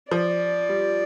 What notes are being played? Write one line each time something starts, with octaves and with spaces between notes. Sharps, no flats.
F3 D5
G3